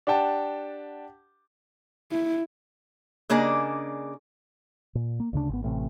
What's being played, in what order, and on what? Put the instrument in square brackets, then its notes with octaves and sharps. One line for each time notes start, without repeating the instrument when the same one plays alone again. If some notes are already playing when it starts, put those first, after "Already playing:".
[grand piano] D4 G4 F#5 G5 A5
[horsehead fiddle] E4
[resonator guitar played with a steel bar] C#3 A#3 D4 G#4 D#5
[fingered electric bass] A#2
A#3
D2 C#3 D4
G#1 B3
A1 A2 C3